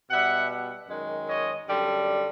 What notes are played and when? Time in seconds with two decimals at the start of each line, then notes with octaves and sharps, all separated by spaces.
0.10 B2 G3 E5 F#5
0.88 F#2 D#3 G#3
1.27 C#5 D#5
1.65 F#2 D3 G3